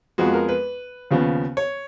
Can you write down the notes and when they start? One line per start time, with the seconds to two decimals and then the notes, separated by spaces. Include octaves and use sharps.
0.18 F2 F3 G#3 B3 F#4
0.33 A#4
0.49 B4
1.11 D#2 C#3 F3 B3
1.57 C#5